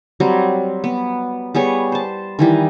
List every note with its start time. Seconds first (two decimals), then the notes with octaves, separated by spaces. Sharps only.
0.20 F#3 G3 C4
0.84 B3
1.54 G3 B3 G#4 C#5
1.92 C5 A5
2.39 D#3 E3 G3